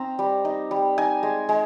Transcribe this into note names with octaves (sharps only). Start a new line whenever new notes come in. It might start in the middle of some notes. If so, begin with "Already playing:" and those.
Already playing: C4 D#4 A#5
G3
D#4
G3
D#4 G#5
G#3
G#3